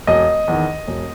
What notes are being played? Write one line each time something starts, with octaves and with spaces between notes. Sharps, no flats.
E1 D#5
E2 D#3
E1